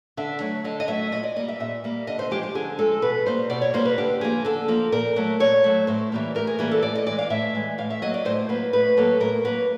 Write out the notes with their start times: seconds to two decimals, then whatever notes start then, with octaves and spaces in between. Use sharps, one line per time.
0.17 D3 E5
0.40 F#3 A3
0.64 D3 D#5
0.80 D#5
0.88 F#3 A3 E5
1.12 A#2 D#5
1.24 D5
1.36 G3 A#3 D#5
1.48 E5
1.60 A#2 E5
1.84 G3 A#3
2.07 D3 D#5
2.19 C5
2.31 F3 G#3 G4
2.43 G4
2.55 D3 G#4
2.78 F3 G#3 A4
3.02 B2 B4
3.26 G3 A#3 C5
3.50 B2 D5
3.62 C#5
3.74 G3 A#3 C5
3.85 B4
3.98 D3 G4
4.21 F3 A#3 G#4
4.45 D3 A4
4.68 F3 A#3
4.92 A#2 A#4
5.16 F#3 A3
5.40 A#2 C#5
5.64 F#3 A3
5.87 A2 C5
6.12 E3 G3 A#3
6.35 A2 A#4
6.47 G#4
6.59 E3 G3 A#3 G#4
6.71 A4
6.82 A2 D5
6.95 D#5
7.06 E3 G#3 D5
7.19 F5
7.30 A2 E5
7.55 E3 G#3
7.78 A2 F5
7.90 E5
8.02 F#3 A#3 D#5
8.14 D5
8.25 A2 C5
8.49 F#3 A#3 B4
8.73 A2 B4
8.97 F#3 A#3 A4
9.20 A2 A#4
9.45 F#3 A#3 B4